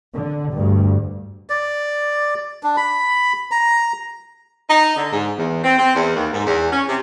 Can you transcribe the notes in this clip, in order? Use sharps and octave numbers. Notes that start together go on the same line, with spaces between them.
D3
D2 G2
D5
D4
B5
A#5
D#4
D3
G#2
E2
C4
C4
E2
D#2
G#2
E2
C#4
C3